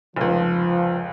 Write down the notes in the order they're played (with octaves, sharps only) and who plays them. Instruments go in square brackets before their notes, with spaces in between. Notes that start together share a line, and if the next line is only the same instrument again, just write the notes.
[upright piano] F1 C#2 [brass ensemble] F3